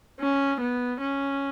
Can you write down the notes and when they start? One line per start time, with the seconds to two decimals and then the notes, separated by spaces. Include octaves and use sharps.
0.20 C#4
0.60 B3
1.01 C#4